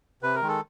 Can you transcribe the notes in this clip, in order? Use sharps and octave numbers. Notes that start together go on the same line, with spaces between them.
C3 B4
A#4
D#3 G#3
A4